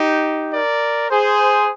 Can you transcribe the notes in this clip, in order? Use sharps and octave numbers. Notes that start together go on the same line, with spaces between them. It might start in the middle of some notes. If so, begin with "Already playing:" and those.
Already playing: D#4 G4
A#4 D5
G#4 C5